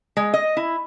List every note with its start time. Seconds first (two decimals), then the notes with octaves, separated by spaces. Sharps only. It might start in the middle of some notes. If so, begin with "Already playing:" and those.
0.17 G#3
0.34 D#5
0.57 E4